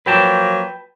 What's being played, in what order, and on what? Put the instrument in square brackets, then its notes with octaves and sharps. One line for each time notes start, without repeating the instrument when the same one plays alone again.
[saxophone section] F3 F#3 A#3 [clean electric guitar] B4 G5 A5